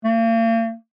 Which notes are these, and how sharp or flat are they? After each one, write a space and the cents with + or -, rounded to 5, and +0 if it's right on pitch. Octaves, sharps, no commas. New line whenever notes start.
A#3 -40